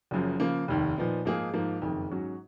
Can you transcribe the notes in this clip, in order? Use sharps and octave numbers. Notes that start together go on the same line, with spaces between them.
F#1 F#2 F3
C#3 F3 A#3
F1 D#2 D#3
A#2 F3 B3 D#4
G#2 F3 A#3 D#4 G#4
G#2 F3 A#3
F#1 F2 D#3
G#2 F#3 C#4 F#4